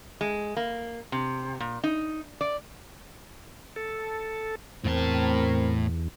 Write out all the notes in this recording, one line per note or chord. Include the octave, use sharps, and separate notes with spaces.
G#3
A#3
C3
A#2
D#4
D5
A4
E2 A2 C4 A#4 A5